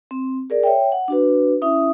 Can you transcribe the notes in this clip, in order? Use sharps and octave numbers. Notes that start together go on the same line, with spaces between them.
C4
G#4 A#4 D5
C#5 E5 G5
F#5
D4 F#4 B4
C#4 E4 E5 D#6